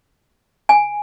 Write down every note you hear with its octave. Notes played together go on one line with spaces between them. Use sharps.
G#5